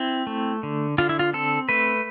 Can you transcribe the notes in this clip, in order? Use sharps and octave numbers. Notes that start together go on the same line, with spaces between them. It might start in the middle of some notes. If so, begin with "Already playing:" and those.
Already playing: C4 E4
A3
D3
D3 F4
E4
F4
C4 A4
A3 B4